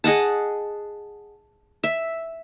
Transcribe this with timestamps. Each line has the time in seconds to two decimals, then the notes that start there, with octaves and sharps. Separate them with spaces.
0.04 G#4 D#5 F#5 A5
1.84 E5